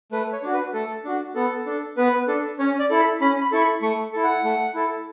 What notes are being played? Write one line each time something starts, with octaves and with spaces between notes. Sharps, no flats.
A3 B4
C#5
D4 F#4
B4
A3 A4
D4 F#4
B3 A4
D4 A4
B3 B4
D4 A4
C#4 C#5
D5
E4 A4
B5
C#4 B5
B5
E4 A4 C#6
B5
A3 C#6
E4 A4
F#5
A3
E4 A4